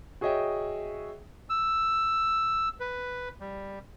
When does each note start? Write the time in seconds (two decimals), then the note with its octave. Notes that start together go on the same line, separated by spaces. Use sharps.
0.21 F#4 G#4 C#5 D#5 E5 G5
1.50 E6
2.80 B4
3.40 G3